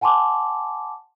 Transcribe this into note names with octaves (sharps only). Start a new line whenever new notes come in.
F#5 G#5 A5 C6 D6